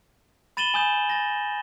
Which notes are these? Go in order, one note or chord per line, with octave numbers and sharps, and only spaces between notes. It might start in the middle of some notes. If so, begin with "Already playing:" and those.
B5 A6 D#7 E7 F#7 G7
G#5 D#6 G6 E7
A6 A#6